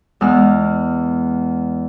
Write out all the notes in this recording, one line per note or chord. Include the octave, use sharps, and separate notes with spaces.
E2 G#3 F6